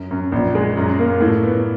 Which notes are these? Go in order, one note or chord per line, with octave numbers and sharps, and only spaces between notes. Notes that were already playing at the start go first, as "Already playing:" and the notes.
Already playing: F#2
F#2
A#1
G#3
F#2
A#3
A2
B3